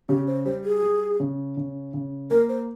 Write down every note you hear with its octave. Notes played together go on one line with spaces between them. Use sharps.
C#3 G4
C5
G3 C5
G#4
G3
C#3
C#3
C#3
A#3 A#4
C5